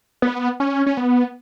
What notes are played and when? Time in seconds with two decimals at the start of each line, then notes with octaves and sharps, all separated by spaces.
0.22 B3
0.60 C#4
0.86 C#4
0.97 B3